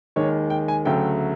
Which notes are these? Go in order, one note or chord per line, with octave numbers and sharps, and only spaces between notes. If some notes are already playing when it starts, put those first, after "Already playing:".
D#2 D#3 G#3 C#5
G5
G#5
D2 C#3 F#3 A3 G5